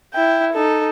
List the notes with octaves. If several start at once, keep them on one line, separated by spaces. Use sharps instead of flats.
E4 G5
D#4 A4